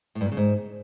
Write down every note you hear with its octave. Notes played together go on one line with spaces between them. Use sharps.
A2
G2
A#2
C#3
G#2